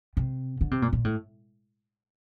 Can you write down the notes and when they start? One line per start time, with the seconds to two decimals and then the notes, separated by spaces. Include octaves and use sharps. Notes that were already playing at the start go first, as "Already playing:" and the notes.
0.17 C3
0.61 D3
0.71 C3
0.82 A#2
0.93 A#2
1.05 A2